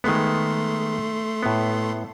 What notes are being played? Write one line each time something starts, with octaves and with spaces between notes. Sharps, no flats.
D#3 G#3 A3 B3 C6
A2 B3